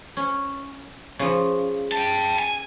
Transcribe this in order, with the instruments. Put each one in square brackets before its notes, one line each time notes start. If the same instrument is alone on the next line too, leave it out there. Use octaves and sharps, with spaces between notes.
[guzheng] C#4
C#3 F3
[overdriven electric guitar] G5 A5
G#5